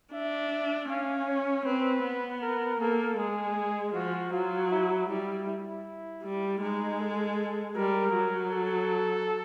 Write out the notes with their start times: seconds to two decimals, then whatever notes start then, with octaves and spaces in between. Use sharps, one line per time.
0.13 D4 E5
0.89 C#4 F5
1.28 C#5
1.65 C4 B4
2.04 B3
2.42 A#4
2.80 A#3 A4
3.19 G#3 G#4
3.95 F3 F#4
4.33 F#3 F4
4.71 E4
5.09 G3 E4
5.47 E4
6.24 G3
6.62 G#3 D#4
7.00 A4
7.76 G3 A#4
8.14 F#3
8.52 A4